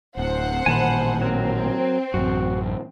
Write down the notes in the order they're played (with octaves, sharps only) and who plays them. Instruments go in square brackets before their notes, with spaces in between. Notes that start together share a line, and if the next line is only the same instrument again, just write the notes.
[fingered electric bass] D1 [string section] C5 F#5
[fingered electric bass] A1 A#2 D#3 [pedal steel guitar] G#5 A5 B5
[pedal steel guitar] F#3 A#4 [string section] C4
[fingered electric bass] A1 F#2 [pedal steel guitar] F#4